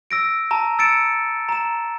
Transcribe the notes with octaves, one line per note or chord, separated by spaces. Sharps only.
E6 A#6 D7
A5 A#5
E6 A6 C#7 D7 E7
A#5 E7